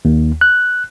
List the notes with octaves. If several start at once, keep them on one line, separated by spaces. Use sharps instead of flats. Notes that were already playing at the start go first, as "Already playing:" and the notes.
D#2
F#6